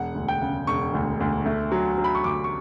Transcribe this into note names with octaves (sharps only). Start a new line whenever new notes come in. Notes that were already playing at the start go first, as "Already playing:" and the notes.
Already playing: E1 F#5
D2
G5
C#3
E1 C#6
D2
D2
A3
F#3
F#3
B5
C#6
D2 D6
C#6